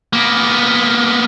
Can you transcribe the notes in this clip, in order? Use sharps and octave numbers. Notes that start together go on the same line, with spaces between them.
A#3 B3